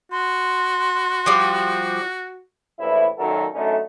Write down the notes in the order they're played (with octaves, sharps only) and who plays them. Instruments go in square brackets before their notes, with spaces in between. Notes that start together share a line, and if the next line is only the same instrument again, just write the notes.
[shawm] F#4 [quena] C6
[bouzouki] F3 G3
[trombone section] A#1 A2 E3 E4
F#2 A#2 D#3 F#3 A4 A#4
F#2 D3 A3 C#4 D#4